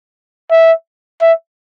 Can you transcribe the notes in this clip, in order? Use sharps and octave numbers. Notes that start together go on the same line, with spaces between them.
E5
E5